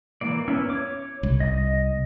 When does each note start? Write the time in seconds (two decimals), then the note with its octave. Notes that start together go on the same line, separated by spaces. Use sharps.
0.21 E3 A#3 D5
0.48 B3 C#4 E4
0.70 C#5 D6
1.23 C2
1.40 D#5